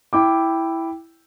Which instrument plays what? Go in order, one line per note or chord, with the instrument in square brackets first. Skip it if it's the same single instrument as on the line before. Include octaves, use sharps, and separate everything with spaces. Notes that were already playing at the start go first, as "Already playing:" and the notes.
[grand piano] E4 G5 D6